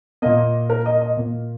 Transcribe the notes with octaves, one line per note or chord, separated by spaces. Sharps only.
A#2 A#3 D#5
A#4
D#5
D#5
A#2 A#3